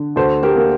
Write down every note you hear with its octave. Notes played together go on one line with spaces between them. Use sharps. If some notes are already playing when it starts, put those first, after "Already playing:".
Already playing: D3
D2 A4 C5
G4 A#4
A#3